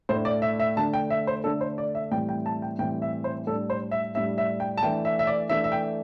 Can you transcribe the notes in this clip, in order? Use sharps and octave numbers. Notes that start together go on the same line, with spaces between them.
A2 A3 D4 C5
D5
E5
E5
D3 A3 D4 A5
G5
E5
C5
D3 A3 D4 A4
C5
D5
E5
A2 E3 G3 C4 G5
G5
A5
G5
A2 E3 G3 C4 G5
E5
C5
A2 G3 D4 A4
C5
E5
A2 G3 D4 E5
E5
G5
A5
E3 A3 D4 G5
E5
E5
D5
E3 A3 D4 E5
E5
G5